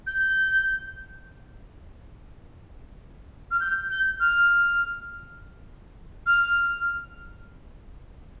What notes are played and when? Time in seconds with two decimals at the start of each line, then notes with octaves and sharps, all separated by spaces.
0.07 G6
3.51 F6
3.60 G6
3.90 G6
4.20 F6
6.26 F6